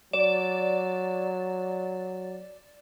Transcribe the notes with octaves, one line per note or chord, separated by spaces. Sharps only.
F#3 D5 E7